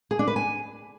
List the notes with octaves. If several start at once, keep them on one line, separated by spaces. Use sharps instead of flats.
G#4
D4
B4
G#5